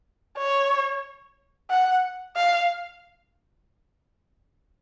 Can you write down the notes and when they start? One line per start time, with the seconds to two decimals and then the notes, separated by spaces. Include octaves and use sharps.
0.38 C#5
1.70 F#5
2.36 F5